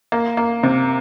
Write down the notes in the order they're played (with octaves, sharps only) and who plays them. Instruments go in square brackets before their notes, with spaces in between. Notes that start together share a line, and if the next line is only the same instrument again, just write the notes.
[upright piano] A#3
A#3
C3